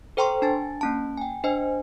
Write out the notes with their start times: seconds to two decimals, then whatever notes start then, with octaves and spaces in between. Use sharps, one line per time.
0.17 A4 C5 G5 A#5 C6 C#6
0.42 D4 G#5 A5 A6
0.81 A#3 C#4 A5
1.17 G5 G#5
1.44 D4 C5 D#5 G#5